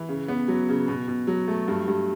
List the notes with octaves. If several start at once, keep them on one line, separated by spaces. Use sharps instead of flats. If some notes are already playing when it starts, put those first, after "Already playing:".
Already playing: E3
C#3
B3
F#3
C#3
B2
B2
F#3
A3
G2
G2